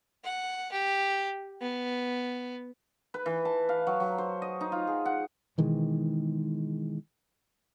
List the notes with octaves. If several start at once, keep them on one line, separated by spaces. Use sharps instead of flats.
F#5
G4
B3
B4
E3
A5
F5
F#3
F#3
C5
D#5
D#4
F4
G#4
F#5
B2 D#3 E3 G#3